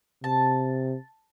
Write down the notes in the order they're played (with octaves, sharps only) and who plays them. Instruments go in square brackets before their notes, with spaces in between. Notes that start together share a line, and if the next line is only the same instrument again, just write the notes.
[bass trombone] C3 [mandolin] A5